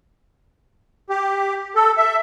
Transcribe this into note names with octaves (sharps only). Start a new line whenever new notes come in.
G4
A4
E5